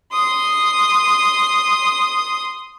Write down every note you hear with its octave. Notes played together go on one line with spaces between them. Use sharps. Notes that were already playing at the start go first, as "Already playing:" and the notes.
C6 D#6